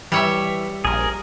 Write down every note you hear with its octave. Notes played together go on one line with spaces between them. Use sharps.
E3 G3 C#5 E5
A#1 G#4 A#4